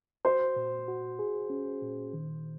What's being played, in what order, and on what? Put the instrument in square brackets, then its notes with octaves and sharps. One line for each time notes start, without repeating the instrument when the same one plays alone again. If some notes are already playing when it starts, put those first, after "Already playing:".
[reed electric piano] F#4 [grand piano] C5
[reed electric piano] A#2
F#4
G#4
C#4
A#2
D#3